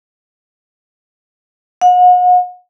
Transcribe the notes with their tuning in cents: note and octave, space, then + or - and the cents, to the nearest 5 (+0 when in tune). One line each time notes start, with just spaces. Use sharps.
F#5 -40